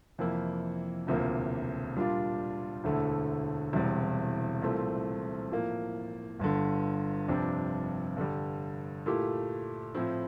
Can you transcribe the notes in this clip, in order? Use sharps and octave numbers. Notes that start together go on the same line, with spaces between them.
F2 C3 E3 A#3 E4
E1 D2 C3 F3 A#3
A#2 G3 D4 F4
E1 D2 D3 A3 E4
E1 E2 C3 G3
C2 A#2 A3 C4
A2 F3 A#3
G1 G2 D3
G1 F2 C3 G3 D4
G2 D3 G3
A#2 A3 E4 G4
A2 F3 C4 E4